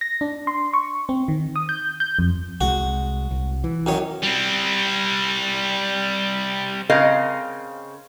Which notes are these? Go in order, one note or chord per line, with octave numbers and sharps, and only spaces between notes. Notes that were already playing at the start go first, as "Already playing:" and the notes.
A#6
D4
C6
C#6
C4
D#3
D#6
G6
G6
F2
C2 G#3 F#4
C2
E3
F#2 D#3 C#5
G3 C4
C#3 C4 A#4 D#5 F5